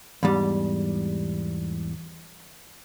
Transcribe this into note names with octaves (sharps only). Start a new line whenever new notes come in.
E2 G#2 G3